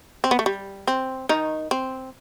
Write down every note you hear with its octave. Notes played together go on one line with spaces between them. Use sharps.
C4
B3
A3
G3
C4
D#3 D#4
C4